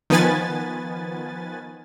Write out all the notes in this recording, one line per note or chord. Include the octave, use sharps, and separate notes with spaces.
D#3 F3 B3 B4 G#5 A6